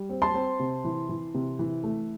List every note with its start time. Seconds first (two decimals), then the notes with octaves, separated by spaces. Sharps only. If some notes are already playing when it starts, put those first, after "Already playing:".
Already playing: G3
0.09 C4
0.22 A5 C6
0.34 C4
0.59 C3
0.84 E3
1.09 E3
1.34 C3
1.59 E3
1.84 A3